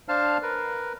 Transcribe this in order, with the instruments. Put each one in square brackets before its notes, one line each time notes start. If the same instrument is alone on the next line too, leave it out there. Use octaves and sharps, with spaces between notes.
[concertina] D4 C5 F5 A5 F6
A#4 B4